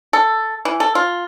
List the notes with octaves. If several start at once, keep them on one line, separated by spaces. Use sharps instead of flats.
A4
E3
A4
F4